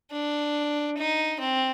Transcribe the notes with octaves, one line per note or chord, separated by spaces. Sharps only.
D4
D#4
C4